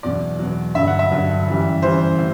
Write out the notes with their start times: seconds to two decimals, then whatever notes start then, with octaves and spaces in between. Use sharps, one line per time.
0.03 E2 B2 F#3 D5
0.39 E2 B2 F#3
0.75 G2 D3 F#3 E5
0.87 F#5
0.99 E5
1.11 G2 D3 F#3
1.47 F#2 E3 G3
1.82 F#2 E3 G3 C5
2.19 A2